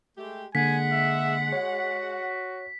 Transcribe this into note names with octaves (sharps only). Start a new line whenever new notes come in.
G#3 A3 G4
D3 G#3 A#3 F#5 G#5 B6
E5
F#4 C#5